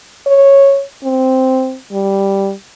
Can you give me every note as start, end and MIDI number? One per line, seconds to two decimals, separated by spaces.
0.26 0.82 73
1.04 1.76 60
1.92 2.52 55